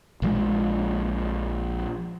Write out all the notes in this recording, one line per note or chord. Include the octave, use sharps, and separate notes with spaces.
A#1 F3 G#3